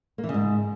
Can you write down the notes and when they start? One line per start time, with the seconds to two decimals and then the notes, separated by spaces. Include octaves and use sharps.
0.18 A#3
0.24 E3
0.29 C#3
0.34 G#2